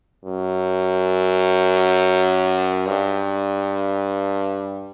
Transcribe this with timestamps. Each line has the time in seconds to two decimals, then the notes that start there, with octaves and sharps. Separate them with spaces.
0.25 F#2
2.87 G2